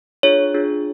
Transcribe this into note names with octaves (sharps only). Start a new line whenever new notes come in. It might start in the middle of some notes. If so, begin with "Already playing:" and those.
D4 F4 G#4 C#5
D4 F4 G#4